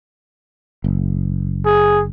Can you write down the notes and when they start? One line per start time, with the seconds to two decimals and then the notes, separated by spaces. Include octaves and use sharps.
0.84 F#1
1.66 G#4